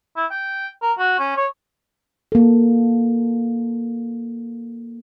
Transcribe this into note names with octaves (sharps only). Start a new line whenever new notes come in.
E4
G5
A#4
F#4
C#4
C#5
A#3 A4